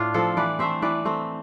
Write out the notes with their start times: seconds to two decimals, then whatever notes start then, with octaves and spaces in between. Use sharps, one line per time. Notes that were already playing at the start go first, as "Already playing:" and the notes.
Already playing: A2 D4 F4
0.14 F3 C4 A4 C5
0.37 E3 B4 D5
0.59 A3 C4 C5 E5
0.82 E3 B4 D5
1.05 A3 C4